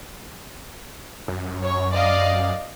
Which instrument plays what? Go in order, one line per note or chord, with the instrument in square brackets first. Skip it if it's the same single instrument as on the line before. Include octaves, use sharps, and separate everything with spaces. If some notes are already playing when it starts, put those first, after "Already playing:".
[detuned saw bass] F#2
[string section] C#5
D5 D#5 F5